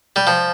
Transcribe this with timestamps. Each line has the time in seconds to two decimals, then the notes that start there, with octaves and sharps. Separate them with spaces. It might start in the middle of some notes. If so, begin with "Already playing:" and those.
0.16 G3
0.27 F3